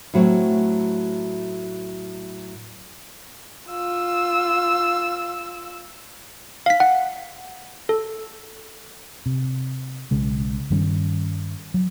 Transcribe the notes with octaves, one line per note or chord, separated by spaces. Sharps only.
A2 F#3 A3 C4
F4 E6
F5 B6
F#5
A4
C3
B1 C#3 G#3
G2 D#3 G3 C#4
F#3